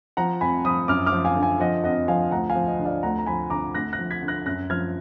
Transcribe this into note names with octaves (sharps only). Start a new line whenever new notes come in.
F3 F#5 A#5
F2 G#5 B5
F3 B5 D#6
F#2 D6 F6
D6 F6
F3
F5 G#5
D3
F5 G#5
F3 D#5 F#5
F2 D#5 F#5
F3 F5 G#5
D2 F#5 A#5
F5 G#5
F3
D#5
D3
D5 F5
D2 F#5 A#5
A#5
F3 G#5 B5
D3 A#5 D6
D2 F#6 A#6
F#6 A#6
F3
G#6 B6
D3
F#6 A#6
F#2 F#6 A#6
F3 F6 G#6